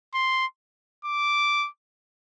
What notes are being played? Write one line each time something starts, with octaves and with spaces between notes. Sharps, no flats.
C6
D6